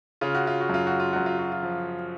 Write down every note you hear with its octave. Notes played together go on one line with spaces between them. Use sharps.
C#3 F4
F#4
F4
F#4
F#2 F4
F#4
F4
F#2 F#4
F4
F#4
F4
F3